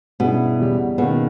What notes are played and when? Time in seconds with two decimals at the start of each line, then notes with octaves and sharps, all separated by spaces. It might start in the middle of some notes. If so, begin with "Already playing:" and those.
0.20 G2 B2 G3 C#4 E4 G#4
0.59 E2 C#3 G3 C#4 G4
0.98 B2 D#3 A#3 C#4 G#4